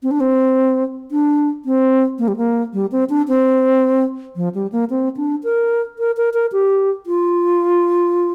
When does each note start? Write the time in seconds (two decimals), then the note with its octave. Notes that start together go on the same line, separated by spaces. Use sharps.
0.03 C4
0.11 D4
0.20 C4
1.11 D4
1.65 C4
2.19 A#3
2.28 G3
2.37 A#3
2.73 G3
2.92 C4
3.09 D4
3.28 C4
4.36 F3
4.55 G3
4.72 A#3
4.90 C4
5.17 D4
5.44 A#4
5.99 A#4
6.17 A#4
6.34 A#4
6.52 G4
7.06 F4